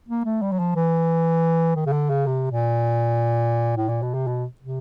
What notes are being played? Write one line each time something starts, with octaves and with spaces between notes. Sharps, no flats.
A#3
A3
G3
F#3
F3
E3
D#3
C#3
D3
C#3
C3
A#2
A2
A#2
B2
C3
B2
C3